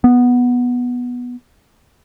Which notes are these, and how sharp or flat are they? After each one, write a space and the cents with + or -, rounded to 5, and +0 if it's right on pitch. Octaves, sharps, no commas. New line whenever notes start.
B3 -5